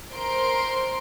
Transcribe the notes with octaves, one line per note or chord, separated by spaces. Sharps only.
A#4 C5 C6 D7